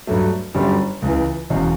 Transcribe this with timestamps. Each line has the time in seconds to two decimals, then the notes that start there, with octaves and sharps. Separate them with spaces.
0.07 G2 F#3 A3
0.55 G1 F#2 D3 G3
1.02 C#2 C#3 E3
1.50 E1 E2 C#3